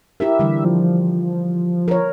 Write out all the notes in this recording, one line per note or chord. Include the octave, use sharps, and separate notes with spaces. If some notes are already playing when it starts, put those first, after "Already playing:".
E4 G4 A#4 E5
D3 E3 G3
F3
A#4 C#5